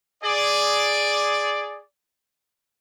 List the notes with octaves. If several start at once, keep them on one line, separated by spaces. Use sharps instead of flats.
G#4 D5